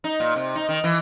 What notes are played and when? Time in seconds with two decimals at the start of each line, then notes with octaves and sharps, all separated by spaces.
0.04 D#4
0.20 A#2
0.36 C3
0.56 D#4
0.69 D#3
0.84 E3